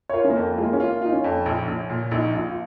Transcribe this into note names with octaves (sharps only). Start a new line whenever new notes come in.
C#5
F4 A#4
C#4
A#3
F2
G#3 F4
A#3
C#4
A#3 F4
D#4 F4
C#4
F2
A#1
A#1
A#2
A#1 D#4
A#1 F4
F4